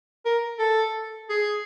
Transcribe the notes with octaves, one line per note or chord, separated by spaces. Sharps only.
A#4
A4
G#4